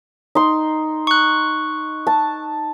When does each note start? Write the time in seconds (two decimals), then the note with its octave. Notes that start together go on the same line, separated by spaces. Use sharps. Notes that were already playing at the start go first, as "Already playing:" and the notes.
0.35 D#4 C6
1.07 C#6 F#6
2.07 A5